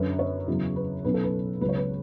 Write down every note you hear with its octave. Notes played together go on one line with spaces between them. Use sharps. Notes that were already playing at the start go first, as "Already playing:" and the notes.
Already playing: F#2 D3 F#3 C#4 B4
C#5
E2 C#3 F#3 C#4
B4
B1 B2 F#3 C#4 B4
A4
B4
C#2 C#3 F#3 B4
C#5
B4